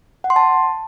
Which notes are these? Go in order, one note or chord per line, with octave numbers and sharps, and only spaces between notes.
F#5
C6
A5